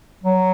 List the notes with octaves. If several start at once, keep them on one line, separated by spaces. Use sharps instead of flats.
F#3